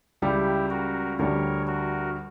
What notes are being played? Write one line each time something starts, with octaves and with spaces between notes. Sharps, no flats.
C#2 C#3 G3 E4 G4
F#4 A#4
D2 D3 G3 A#4 C#5
F#4 A#4